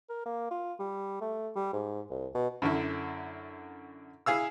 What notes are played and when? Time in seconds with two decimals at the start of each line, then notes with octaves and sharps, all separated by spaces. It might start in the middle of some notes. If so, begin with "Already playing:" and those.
0.09 A#4
0.25 A#3
0.51 F4
0.79 G3
1.21 A3
1.55 G3
1.73 G#2
2.10 C2
2.35 B2
2.62 F#2 D3 E4
4.26 E4 G#4 F5 E6